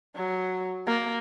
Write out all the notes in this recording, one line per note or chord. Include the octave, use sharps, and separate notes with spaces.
F#3
A#3